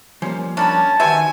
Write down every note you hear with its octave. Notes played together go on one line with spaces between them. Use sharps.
F3 G3 A#3 C#4
C#4 D4 A#4 A5 B5
D#3 F#4 G4 B4 C5 E5 G#5